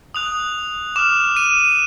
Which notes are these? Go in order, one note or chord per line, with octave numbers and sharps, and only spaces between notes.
D#6 F#6 F7
D6 F6 E7
D#7